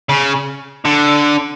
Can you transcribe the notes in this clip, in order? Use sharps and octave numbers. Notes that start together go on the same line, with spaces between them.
C#3
D3